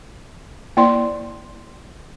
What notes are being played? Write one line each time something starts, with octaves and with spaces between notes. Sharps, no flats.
A#3 E4 C5 D5 C6